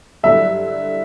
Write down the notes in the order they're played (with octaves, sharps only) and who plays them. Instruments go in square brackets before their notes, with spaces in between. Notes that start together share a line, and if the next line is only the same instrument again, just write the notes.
[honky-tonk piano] G2 D3 F#3 A3 E4 [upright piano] E5